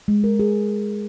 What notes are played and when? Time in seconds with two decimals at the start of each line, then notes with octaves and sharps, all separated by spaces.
0.08 G#3
0.24 A#4
0.39 G#4